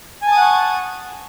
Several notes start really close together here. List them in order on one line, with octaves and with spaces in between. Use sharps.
G#5 A5 D#6 F#5 C#6